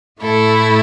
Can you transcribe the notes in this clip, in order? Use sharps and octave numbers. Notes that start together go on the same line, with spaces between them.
A2 A3 E4 A4